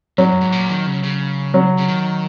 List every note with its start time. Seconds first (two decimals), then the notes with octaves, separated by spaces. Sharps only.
0.18 G#2 F#3
0.30 F#2
0.41 G#2
0.52 A#2
0.69 D#3
0.87 C#3
1.04 C#3
1.54 F#3
1.78 C#3
1.88 D#3